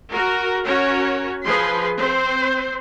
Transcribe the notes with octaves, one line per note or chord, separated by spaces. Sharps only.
F#4 A#4
C#4 F#4 A#4 C#5
F3 G#4 B4 C6
C4 C5